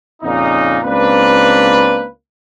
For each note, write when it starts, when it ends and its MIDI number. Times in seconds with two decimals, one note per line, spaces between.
0.22 0.78 41
0.22 0.78 46
0.22 0.78 49
0.22 0.78 63
0.84 2.06 37
0.84 2.06 58
0.84 2.06 60
0.84 2.06 62
0.84 2.06 71